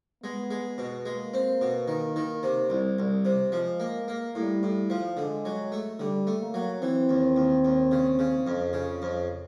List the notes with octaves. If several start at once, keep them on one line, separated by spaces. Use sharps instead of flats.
G#3 B3
G#3
B2
G#3 A#3
C4
B2
D#3
D#3
C3
C2
C2
C3
F3 G#3
A#3
A#3
A2 G3
A2
F3
D3 G#3
F#3
A3
D3 G3
A3
A#3
F#3
E3 C4
D#2
D#2
D#2
C#3
C#3
F2
C#3
F2